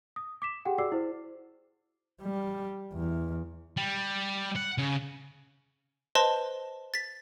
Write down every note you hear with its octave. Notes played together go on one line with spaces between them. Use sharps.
D#6
D6 B6 E7
G4 G#4 F#5 G5
F#4 G#4 D5 D6 E6 C7
E4 C5
G3
E2
G3
F#5
C#3
B4 C5 D#5 A5 C6
A6 B6